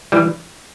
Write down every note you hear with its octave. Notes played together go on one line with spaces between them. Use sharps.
E3 G3